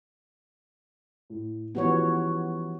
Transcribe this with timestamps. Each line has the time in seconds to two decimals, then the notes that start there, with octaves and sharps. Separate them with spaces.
1.30 A2
1.75 E3 F3 G3 B3 F#4 C#5